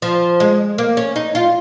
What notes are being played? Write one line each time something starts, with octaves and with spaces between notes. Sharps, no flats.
F3
G#3
A#3
C#4
D#4
F4